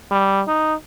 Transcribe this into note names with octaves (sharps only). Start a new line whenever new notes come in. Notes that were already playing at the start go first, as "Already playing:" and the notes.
G3
D#4